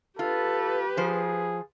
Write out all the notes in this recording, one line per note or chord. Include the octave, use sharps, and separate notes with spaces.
F4 G4 A4 B4
F3 G#4 C5